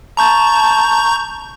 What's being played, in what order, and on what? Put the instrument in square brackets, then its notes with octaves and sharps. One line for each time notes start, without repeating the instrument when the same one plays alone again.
[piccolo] A5 [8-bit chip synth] A#5 C#6 G6